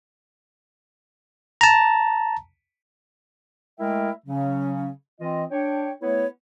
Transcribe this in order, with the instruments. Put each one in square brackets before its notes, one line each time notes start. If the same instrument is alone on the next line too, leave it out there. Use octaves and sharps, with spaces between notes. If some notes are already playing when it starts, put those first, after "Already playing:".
[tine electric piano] A5 A#5
[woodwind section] G#3 A3 E4 A#4 E5 G5
C#3 F#3 C#4
E3 C4 F4 D#5
D4 C#5 G5
A3 B3 E4 B4 C#5